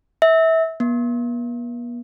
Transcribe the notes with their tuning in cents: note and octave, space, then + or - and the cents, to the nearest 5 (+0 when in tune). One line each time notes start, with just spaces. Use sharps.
E5 -25
B3 -45